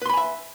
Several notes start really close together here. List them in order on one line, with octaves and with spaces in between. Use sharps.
B4 C6 B5 G#5 E5